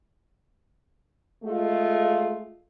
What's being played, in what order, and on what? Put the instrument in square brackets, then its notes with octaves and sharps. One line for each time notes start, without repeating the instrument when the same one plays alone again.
[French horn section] G#3 A3 F4 G#4